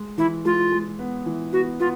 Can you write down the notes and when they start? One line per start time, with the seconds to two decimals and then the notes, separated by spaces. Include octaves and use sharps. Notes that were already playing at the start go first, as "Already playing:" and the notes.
Already playing: G#3
0.18 E3 E4
0.45 G#3 F4
0.72 G#3
0.99 B3
1.26 E3
1.53 B3 F#4
1.80 B3 F4